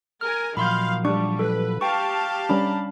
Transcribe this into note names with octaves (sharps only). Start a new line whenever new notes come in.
A#4 G#5 F6
A#2 D#3 F3 F#3 F5 B5 C6 G6
G3 D4 C#6
A4 B4
G4 F5 G5 A5 C#6
G3 C#4 D4 A#5 B5